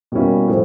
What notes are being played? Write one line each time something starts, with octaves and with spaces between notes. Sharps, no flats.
B2 G3 A#3 C#4 E4
A2 F3